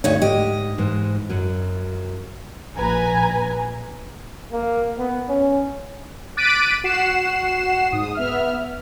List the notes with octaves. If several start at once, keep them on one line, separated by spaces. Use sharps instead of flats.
D2 G2 D#4 C#5
G#2 G4 D#5
G#2 E3 C5
F#2 F#3
A#1 B4 G#5 A#5
A#3
B3
C#4
D6 F#6 A6 B6 D7 D#7
F#4 F#5 C7 E7
G#2 D#6
B3 E5 F6